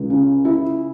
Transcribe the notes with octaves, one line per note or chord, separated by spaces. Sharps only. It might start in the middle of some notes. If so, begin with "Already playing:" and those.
Already playing: C#2
C#3
E4